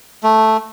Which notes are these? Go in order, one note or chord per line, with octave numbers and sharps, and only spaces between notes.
A3